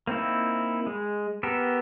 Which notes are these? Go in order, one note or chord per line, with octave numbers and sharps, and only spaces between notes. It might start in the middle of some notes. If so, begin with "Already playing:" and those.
A#3 C4 D#4 E4
G#3
B3 G4 A4 A#4